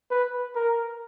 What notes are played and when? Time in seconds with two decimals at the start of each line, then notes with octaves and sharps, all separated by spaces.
0.11 B4
0.55 A#4